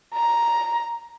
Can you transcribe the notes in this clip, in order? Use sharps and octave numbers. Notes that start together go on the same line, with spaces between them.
A#5